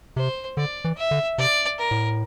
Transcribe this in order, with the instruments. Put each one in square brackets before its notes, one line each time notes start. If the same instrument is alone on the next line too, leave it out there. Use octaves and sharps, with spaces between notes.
[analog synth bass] C3 [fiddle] C5
[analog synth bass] D3 [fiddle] D5
[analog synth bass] E3
[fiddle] E5
[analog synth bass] D3
[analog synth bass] C3 [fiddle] D5
[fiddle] A#4
[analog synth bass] A2